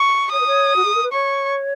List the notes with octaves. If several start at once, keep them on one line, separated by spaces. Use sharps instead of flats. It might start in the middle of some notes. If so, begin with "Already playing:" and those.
Already playing: C#6
C#5 D#6
B4
C#5
F#4
G#4
A#4
B4
C#5 C#6